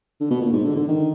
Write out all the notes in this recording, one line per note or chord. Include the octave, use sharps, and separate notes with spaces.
D3
B2
A#2
G#2
D3
D3
D#3